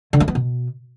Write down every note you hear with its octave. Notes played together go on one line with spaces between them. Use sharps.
D3
A3
B3
B2